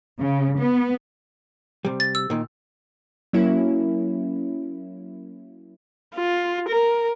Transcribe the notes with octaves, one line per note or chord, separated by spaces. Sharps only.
C#3
B3
C3 G3
A6
E6
A#2 D#3
F#3 A#3 C#4 E4
F4
A#4